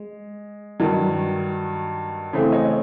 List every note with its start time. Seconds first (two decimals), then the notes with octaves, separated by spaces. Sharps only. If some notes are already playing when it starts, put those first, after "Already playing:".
Already playing: G#3
0.80 G2 D#3 F#3
2.33 C#3 E3 A3 C4
2.52 C#5 D#5